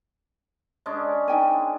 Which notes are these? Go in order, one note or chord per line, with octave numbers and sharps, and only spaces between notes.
G#3 C#4 D4
D#4 G5 G#5